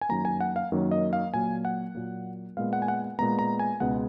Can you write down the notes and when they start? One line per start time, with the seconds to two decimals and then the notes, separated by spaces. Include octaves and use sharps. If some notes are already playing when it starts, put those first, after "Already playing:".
0.01 G#5
0.09 F#2 D#3 F#3 A#3 A#5
0.25 G#5
0.41 F#5
0.56 F5
0.72 F#2 D#3 F#3 A#3
0.91 D#5
1.13 F5
1.34 A#2 F#3 A#3 G#5
1.65 F#5
1.95 A#2 F#3 A#3
2.57 A#2 G#3 B3 F5
2.73 F#5
2.82 G#5
2.88 F#5
3.19 A#2 G#3 B3 A#5
3.39 A#5
3.59 G#5
3.80 C#2 B2 G#3 B3 F#5